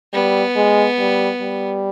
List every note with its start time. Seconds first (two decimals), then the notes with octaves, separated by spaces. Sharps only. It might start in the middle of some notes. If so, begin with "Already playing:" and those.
0.13 G3 B3
0.56 G#3
0.99 G3
1.41 G3